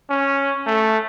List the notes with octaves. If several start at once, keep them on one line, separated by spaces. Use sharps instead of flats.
C#4
A3